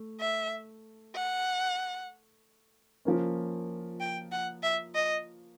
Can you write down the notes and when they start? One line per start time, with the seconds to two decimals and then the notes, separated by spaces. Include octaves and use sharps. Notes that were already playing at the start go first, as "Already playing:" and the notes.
Already playing: A3
0.20 E5
1.15 F#5
3.05 F3 A#3 C#4
4.00 G5
4.32 F#5
4.63 E5
4.95 D#5